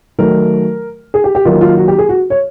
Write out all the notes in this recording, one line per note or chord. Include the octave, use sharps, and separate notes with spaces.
D#3 F#3 A3 A#4
G#4
G4
G4
D#3 F#3 A#3 F4
F4
F#4
G4
G#4
F#4
C#5